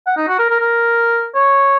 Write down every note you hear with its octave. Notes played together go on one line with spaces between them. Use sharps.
F#5
D#4
F#4
A#4
A#4
A#4
C#5